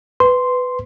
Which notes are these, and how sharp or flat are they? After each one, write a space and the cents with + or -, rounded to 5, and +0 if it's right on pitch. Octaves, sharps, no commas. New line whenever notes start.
B4 +15 C6 -5